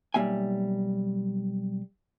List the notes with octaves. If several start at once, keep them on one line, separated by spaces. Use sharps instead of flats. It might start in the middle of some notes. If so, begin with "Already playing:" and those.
B1 G3 A#3 E5 G#5